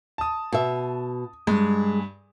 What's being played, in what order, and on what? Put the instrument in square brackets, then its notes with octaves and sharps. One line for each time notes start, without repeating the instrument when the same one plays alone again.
[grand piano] A5 D#6
[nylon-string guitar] B2 E5
[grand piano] G2 [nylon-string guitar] G#3